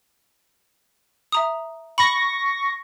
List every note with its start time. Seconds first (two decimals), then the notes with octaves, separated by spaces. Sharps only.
1.32 E5 A#5 D#6
1.98 B5 C#6 A#6